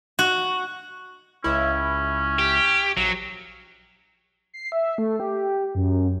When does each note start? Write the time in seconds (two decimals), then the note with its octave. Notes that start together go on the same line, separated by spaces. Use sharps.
0.19 F#4
1.44 C#2 C#4 E4
2.39 G4
2.97 A#1 F#3
4.54 C7
4.72 E5
4.98 A3
5.20 G4
5.75 F#2